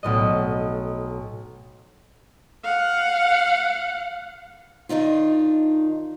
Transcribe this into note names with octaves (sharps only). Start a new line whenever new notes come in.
B1 A2 D#5
F5 F#5
D#3 D4 D#4 F4